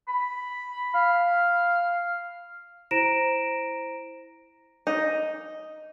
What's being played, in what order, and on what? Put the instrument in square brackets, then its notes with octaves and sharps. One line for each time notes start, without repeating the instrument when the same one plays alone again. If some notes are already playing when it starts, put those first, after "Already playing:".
[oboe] B5
F5
[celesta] E4 C5 A#5 A#6 D7 E7
[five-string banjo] D#4